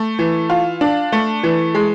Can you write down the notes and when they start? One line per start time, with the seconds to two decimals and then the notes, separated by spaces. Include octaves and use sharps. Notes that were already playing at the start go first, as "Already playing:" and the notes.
Already playing: A3
0.19 E3
0.50 F4
0.81 D4
1.12 A3
1.43 E3
1.75 G#3